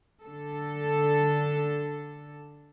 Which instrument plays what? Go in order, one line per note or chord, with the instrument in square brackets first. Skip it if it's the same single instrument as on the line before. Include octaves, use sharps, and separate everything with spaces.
[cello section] D3 A4